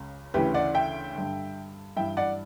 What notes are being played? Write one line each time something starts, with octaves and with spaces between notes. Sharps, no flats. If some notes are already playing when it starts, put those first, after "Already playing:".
Already playing: C#2 C#3
D2 C#3 E3 G4 B4
D5 F#5
E5 G5
G2 D3
G2 E3 E5 G5
D5 F#5